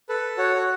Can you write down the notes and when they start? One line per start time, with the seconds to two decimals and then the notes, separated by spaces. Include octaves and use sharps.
0.09 A4 B4
0.37 F#4 C#5